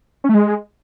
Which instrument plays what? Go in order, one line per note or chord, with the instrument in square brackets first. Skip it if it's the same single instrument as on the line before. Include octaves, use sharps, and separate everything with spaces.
[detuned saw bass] C#4
A3
G#3